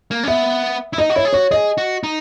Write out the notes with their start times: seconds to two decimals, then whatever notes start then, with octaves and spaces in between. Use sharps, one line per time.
0.11 A#3
0.24 C#4
0.28 B3 E5
0.93 E4
0.98 D#4 D#5
1.10 F#4
1.16 E4 C#5
1.25 G#4
1.33 F#4 C#5
1.51 G#4 D#5
1.78 F#4
2.03 D#4